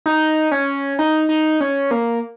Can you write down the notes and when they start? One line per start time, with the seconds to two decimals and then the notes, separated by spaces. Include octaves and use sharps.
0.06 D#4
0.52 C#4
0.99 D#4
1.29 D#4
1.61 C#4
1.91 A#3